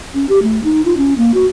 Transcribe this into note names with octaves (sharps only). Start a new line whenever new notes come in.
C#4
G4
A3
D#4
F4
C#4
A#3
F#4